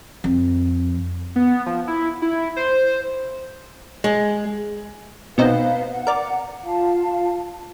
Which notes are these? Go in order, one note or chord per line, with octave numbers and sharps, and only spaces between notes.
F2
B3
F3
E4
E4
C5
G#3
B2 C4 D#4 B4 F5
F#5
A#4 D5
F4 F5 A5